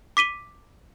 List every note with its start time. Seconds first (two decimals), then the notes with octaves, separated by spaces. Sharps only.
0.17 D6 B6 D#7 G7